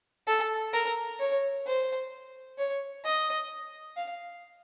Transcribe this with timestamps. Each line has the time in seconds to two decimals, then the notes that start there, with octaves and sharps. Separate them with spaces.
0.28 A4
0.73 A#4
1.20 C#5
1.66 C5
2.58 C#5
3.05 D#5
3.97 F5